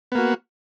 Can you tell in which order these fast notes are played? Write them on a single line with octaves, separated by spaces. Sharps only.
B3 A#3 F#4